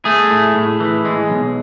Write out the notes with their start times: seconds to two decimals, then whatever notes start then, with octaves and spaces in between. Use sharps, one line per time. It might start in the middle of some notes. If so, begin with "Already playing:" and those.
0.05 A3 G#4
0.30 A2
0.55 A2
0.80 E3
1.05 G#3
1.30 B1